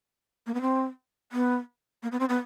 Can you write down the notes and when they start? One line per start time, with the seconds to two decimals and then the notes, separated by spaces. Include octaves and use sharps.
0.46 A#3
0.54 B3
0.61 C4
1.32 B3
2.03 A#3
2.12 B3
2.20 C4
2.29 B3